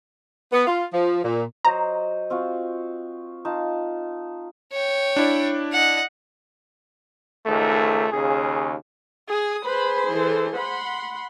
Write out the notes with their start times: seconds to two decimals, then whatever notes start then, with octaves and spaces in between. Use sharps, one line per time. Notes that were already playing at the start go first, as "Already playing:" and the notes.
0.53 B3
0.67 F4
0.93 F3
1.23 A#2
1.65 F#3 C5 D#5 A#5
2.30 C4 F4 F#4
3.45 D#4 F4 A5
4.72 C#5 G5
5.16 D4 E4 D5
5.72 D#5 F#5
7.46 C#2 G#2 D#3 A3
8.12 D#2 C#3 G#4
9.28 G#4 D#6
9.65 G#4 B4 C5 B5
10.09 E3 A4
10.55 F#5 B5 C6